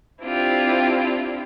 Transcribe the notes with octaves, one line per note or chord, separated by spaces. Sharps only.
C4 D4 E4 F4 G4